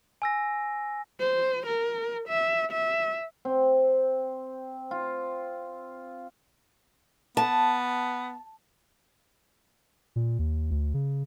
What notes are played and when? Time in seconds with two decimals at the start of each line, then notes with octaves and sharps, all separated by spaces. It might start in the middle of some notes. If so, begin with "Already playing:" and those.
0.22 G#5 E6 A#6
1.20 C5
1.66 A#4
2.28 E5
2.72 E5
3.45 C4
4.91 F4
7.37 B3 A5
10.16 A#2
10.39 D#2
10.71 D2
10.94 C#3